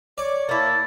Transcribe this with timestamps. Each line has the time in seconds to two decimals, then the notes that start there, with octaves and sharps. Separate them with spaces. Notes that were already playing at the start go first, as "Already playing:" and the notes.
0.18 C#5 D5
0.49 A#3 E4 A5